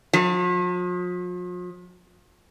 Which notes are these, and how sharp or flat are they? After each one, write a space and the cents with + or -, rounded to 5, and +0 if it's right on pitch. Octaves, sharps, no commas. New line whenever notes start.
F3 +45